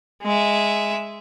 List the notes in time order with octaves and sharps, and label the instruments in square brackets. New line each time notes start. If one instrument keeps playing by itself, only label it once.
[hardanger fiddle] G#3 E5